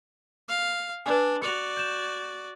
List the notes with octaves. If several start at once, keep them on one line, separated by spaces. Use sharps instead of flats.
F5
D4 B4 D5 G#5
F#4 D5 C#7 F7
G6 E7